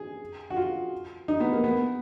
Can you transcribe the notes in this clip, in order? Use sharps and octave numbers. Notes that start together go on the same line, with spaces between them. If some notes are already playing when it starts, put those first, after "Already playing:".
Already playing: G#4
F#4
F4
D#4
B3
A#3
B3